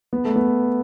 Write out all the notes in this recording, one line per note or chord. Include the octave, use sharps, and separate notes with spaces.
B3
A3
B3